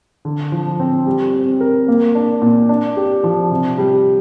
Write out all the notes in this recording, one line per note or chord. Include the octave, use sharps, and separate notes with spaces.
D3
F3
C4
G3
C4
A#4
A#3
D4
A#2
D4
G4
F3
C3
G3